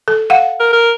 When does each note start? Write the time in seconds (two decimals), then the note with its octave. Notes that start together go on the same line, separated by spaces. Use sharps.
0.08 A4
0.30 F5 F#5
0.60 A#4
0.73 A#4